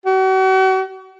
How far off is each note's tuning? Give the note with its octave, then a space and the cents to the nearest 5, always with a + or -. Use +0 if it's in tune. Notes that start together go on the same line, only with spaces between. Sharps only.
F#4 +40